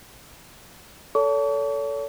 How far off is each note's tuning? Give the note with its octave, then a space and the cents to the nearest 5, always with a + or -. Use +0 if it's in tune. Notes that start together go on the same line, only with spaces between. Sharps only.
A4 +5 C#5 +40 C#6 +45